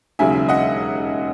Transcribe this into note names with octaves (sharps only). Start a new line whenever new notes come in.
E1 D#2 C#3 F#3 E5 G#5
D#5 F#5